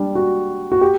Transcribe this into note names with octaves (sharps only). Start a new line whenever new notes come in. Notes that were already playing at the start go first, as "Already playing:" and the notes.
Already playing: G3 D4
F#4
F#4
G4